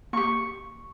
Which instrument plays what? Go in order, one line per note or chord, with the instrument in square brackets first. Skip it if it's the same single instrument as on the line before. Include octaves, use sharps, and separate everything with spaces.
[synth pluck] A#3 G4 [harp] C#6